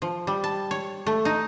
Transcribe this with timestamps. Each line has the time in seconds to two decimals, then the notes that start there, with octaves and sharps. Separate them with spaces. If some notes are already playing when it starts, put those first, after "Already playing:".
0.02 F3
0.27 G3
0.44 A5
0.71 C#5
1.06 A3
1.25 D#4